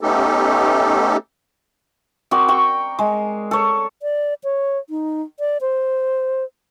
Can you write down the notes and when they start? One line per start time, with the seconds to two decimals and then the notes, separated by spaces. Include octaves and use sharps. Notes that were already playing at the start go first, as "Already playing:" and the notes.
0.01 A3 B3 C#4 D#4 G4 A4
2.31 C4 F#4 A#4 D5
2.48 G5 C#6
2.99 G#3
3.51 A4 C#5
4.02 D5
4.44 C#5
4.90 D#4
5.40 D5
5.61 C5